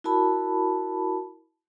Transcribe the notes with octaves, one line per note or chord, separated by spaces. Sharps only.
E4 F#4 A#4 A5 B5